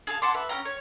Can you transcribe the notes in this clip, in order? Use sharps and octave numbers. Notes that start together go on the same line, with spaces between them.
G#4 A4 F5 A5
F#5 A5 C6 D6
B4 E5
C#4 F4 G5 A#5
C#5